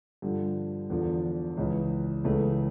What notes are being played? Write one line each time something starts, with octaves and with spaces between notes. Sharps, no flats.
G2 D3 F3
E2 D3 F3
C#2 C#3 E3
C#2 C#3 E3 A3